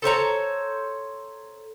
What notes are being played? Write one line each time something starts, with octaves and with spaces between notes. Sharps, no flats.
A4 C5 C#5 A#5